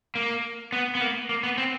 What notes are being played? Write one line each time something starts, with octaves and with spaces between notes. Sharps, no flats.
A#3
B3
B3
A#3
A#3
B3
C4